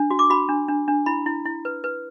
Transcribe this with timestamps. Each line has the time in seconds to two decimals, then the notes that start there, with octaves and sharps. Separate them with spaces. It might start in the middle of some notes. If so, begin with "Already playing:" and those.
Already playing: D4
0.11 F#4
0.19 D6
0.30 F#4 B5
0.49 D4
0.68 D4
0.88 D4
1.06 E4 B5
1.26 E4
1.45 E4
1.65 B4
1.84 B4